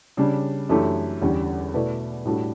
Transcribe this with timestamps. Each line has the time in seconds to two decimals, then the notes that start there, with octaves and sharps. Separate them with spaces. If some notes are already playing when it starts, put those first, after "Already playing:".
0.17 C#3 G3 D4
0.69 F#2 E3 A3 D4 G4
1.22 E2 D3 G3 C#4 G4
1.74 B2 A3 E4 B4 D5
2.25 A2 G3 D4 F#4 A4